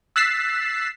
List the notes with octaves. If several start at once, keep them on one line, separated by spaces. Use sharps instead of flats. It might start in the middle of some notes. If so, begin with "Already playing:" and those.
E6 F#6 A6 B6 C7 E7